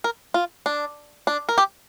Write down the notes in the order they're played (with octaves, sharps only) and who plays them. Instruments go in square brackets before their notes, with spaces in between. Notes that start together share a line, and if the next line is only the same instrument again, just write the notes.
[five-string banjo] A#4
F4
D4
D4
A#4
G4